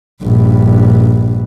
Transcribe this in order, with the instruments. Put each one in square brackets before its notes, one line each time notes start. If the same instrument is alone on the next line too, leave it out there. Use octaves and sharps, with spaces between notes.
[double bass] A#1 G2